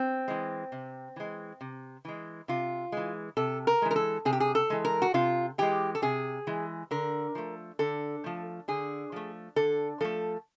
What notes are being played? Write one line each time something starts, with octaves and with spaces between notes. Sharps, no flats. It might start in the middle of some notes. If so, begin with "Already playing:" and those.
Already playing: C4
E3 G#3
C3
E3 G#3
C3
E3 G#3
C3 F4
E3 G#3
C3 A4
A#4
E3 G#3
A#4
A4
C3 G#4
G4
G#4
A4
E3 G#3
A#4
F#4
C3 F4
E3 G#3 G4
A4
C3 G#4
E3 G#3
D3 A#4
F3 A3
D3 A4
F3 A3
D3 G#4
F3 A3
D3 A4
F3 A3 A4